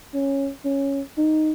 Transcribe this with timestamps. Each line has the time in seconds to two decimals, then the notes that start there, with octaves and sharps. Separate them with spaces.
0.14 C#4
0.65 C#4
1.18 D#4